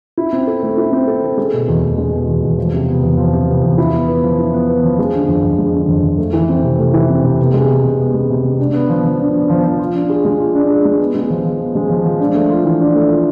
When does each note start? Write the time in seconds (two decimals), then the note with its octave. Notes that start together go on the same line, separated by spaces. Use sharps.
0.17 E4
0.33 C4
0.47 A4
0.63 A3
0.78 E4
0.92 C4
1.07 A4
1.23 A3
1.37 G#3
1.53 B2
1.68 E2
1.83 E2
1.98 G#3
2.13 B2
2.28 E2
2.43 E2
2.58 F3
2.74 C3
2.88 B3
3.03 E2
3.17 F3
3.33 C3
3.49 B3
3.63 E2
3.78 E4
3.93 B3
4.08 B4
4.23 F3
4.38 E4
4.54 B3
4.68 B4
4.83 F3
4.99 G#3
5.14 D3
5.28 F2
5.44 F2
5.58 G#3
5.74 D3
5.88 F2
6.03 F2
6.18 A3
6.33 E3
6.49 C4
6.64 C3
6.78 A3
6.93 E3
7.09 C4
7.24 C3
7.38 B3
7.54 G#3
7.69 C3
7.84 C3
7.99 B3
8.14 G#3
8.29 C3
8.44 C3
8.59 D4
8.74 B3
8.89 F3
9.04 F3
9.19 D4
9.34 B3
9.49 F3
9.64 F3
9.79 F4
9.94 D4
10.09 G#4
10.25 G#3
10.39 F4
10.55 D4
10.70 G#4
10.85 G#3
10.99 B3
11.15 G#3
11.30 F3
11.45 F3
11.60 B3
11.75 G#3
11.89 F3
12.05 F3
12.20 D4
12.35 A3
12.50 F4
12.65 E3
12.80 D4
12.95 A3
13.10 F4